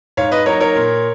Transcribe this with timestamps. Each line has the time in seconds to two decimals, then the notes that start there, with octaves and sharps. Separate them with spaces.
0.17 G#2 C#5 F5
0.31 B4 D#5
0.46 F#3 A#3 D#4 A#4 C#5
0.60 A#4 C#5
0.75 A#2